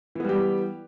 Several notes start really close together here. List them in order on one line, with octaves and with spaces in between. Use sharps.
E3 B3 G3 G4